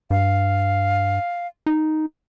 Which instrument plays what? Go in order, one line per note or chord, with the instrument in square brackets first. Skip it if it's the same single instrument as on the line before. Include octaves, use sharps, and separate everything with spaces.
[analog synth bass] G2 [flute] F5
[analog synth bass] D#4